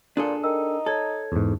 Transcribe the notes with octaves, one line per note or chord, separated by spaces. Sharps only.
A#2 D4 G#4 A4
D#4 A#4 G5 E6
A4 C#5 G#6
E2 G#2